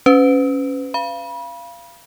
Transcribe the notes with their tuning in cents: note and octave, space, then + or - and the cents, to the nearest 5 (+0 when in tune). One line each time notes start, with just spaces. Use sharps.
C#4 +0 B4 +35
F5 -25 B5 -30